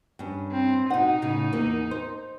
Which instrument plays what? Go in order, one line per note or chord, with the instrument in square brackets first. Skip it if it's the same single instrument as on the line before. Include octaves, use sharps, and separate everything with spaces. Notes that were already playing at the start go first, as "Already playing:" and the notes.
[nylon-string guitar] G2 C#4
[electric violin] C4
[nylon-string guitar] B2 F#5 [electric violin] D#4
[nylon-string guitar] A2 C#3
E2 A#3
C5